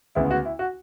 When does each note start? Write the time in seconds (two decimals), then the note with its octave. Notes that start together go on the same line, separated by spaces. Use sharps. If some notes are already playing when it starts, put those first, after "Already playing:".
0.15 D2 C#3 G#3 B3 E4
0.31 F#4
0.45 E4
0.59 F#4